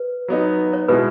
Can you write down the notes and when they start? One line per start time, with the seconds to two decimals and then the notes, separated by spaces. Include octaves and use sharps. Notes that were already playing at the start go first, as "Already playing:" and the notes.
Already playing: B4
0.28 F#3 B3 D#4
0.73 C#5
0.88 B2 G#3 B3 E4 B4